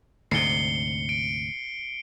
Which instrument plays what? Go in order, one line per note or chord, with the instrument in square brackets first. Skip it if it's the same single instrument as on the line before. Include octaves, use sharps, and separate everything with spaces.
[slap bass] D2 G#2 C3 [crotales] C7 C#7 G7
[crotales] D7